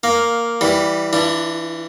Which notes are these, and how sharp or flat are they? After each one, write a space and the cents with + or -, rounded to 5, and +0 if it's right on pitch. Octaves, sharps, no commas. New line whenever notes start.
A#3 +0 F5 +10
E3 +0 G3 +0 F4 +45
E3 +0 D4 +10 F4 -35